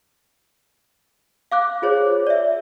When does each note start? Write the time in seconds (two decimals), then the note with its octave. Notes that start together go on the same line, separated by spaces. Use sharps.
1.52 F5 D6 F#6
1.82 F4 G#4 C5 C#5
2.27 D5 E5